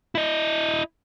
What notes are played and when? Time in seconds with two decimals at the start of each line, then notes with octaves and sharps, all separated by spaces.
0.15 E4 D#5